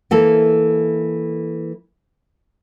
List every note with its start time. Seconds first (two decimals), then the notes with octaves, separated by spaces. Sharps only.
0.11 E3 A#3 A4